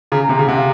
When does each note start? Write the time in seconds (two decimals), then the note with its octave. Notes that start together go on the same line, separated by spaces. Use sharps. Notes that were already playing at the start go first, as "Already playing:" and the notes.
0.12 C#3 A#5
0.24 A#5
0.29 C3
0.36 C#3 A#5
0.48 C3 F#5
0.57 F5